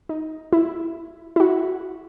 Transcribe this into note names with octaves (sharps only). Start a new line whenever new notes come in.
D#4
E4
E4
F#4